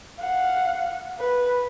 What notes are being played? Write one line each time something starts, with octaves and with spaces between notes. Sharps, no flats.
F5 F#5
B4